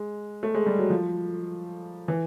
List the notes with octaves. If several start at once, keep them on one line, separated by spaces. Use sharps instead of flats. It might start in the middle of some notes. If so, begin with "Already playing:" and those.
Already playing: G#3
A3
G#3
G3
F#3
F3
E3